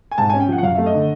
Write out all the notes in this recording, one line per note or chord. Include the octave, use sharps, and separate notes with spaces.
G#5
G#2 A5
C#4 G#5
G5
F3 F#5
F#5
F#2 F5
A3 E5
D#5
D3